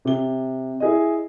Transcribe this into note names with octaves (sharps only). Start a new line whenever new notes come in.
C3 G7
E4 G#4 D#5